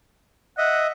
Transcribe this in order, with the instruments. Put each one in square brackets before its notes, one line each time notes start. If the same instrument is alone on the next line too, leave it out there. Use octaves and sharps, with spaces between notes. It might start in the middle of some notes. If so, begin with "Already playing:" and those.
[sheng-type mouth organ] D#5 E5 [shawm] F#5